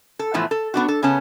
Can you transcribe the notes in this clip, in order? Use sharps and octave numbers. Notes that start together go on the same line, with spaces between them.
A4
A2 E3 F3 A3 B3
A4
B3 D4 F#4
A4
C#3 B3 C#4 A5